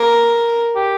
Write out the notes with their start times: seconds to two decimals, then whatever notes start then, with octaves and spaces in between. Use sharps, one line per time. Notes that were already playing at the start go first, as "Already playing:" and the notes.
Already playing: A#3 A#4
0.76 G4